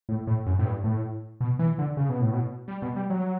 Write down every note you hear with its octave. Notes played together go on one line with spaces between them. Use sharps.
A2
A2
F#2
A2
G2
A2
B2
E3
D3
C#3
B2
A2
B2
G3
B2
G3
F#3